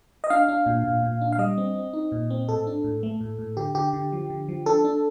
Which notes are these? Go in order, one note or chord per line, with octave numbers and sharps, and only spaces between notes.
D#5
D4 F5
D4
A#2
A#2
A#2
D4
F5
G3 D#5
C4
C4
D#4
A#2
C4
A2 A4
D4
A2
A3
A2
A2
D3 G4
D3 G4
D3
F3
D3
F3
D4 A4
D4